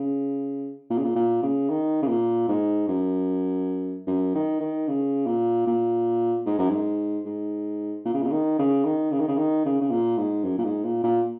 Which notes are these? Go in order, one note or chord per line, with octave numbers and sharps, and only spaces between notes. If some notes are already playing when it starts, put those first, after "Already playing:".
Already playing: C#3
A#2
C#3
A#2
A#2
C#3
D#3
C#3
A#2
G#2
F#2
F#2
D#3
D#3
C#3
A#2
A#2
G#2
F#2
G#2
G#2
A#2
C#3
A#2
C#3
D#3
C#3
D#3
C#3
D#3
C#3
D#3
C#3
C#3
A#2
G#2
F#2
A#2
G#2
A#2
A#2